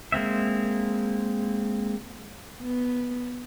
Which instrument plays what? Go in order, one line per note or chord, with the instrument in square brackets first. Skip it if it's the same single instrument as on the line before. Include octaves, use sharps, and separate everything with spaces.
[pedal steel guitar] G#3 A#3 C4 E5
[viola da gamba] B3